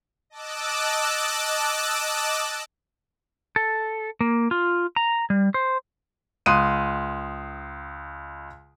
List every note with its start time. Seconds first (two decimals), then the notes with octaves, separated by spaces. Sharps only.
0.30 D#5 A5 D6 E6 F#6
3.56 A4
4.21 A#3
4.51 F4
4.96 A#5
5.30 G3
5.54 C5
6.46 C#2 C6 D#6 F#6 D#7